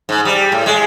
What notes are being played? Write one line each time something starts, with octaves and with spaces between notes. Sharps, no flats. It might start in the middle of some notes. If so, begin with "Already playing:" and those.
G#2
G3
A2
G#3